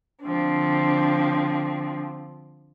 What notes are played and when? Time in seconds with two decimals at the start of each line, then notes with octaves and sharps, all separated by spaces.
0.23 D3 F3 C4 D4